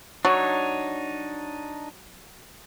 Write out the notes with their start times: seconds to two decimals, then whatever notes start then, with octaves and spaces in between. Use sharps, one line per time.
0.25 F#3 D4 D#4 C#5